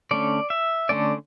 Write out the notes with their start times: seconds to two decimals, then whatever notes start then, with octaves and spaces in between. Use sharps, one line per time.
0.11 D3 A3 C#4 D5
0.50 E5
0.89 D3 A3 C#4 D5